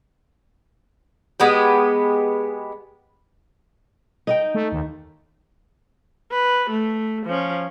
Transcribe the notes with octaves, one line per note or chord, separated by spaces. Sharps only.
G#3 B3 G4
D#4 D#5 G5
A3
D#2
B4
A3
F3 C#4